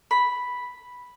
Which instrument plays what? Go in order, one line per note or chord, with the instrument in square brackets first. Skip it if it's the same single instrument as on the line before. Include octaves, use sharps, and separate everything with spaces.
[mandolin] B5